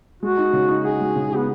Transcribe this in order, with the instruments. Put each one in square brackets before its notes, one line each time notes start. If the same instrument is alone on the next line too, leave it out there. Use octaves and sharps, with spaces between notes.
[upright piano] G#3 [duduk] F#4
[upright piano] D#4
C#3
D#4
[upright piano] F#4 [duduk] G#4
[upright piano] G#3
C#3
F#4
[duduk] B3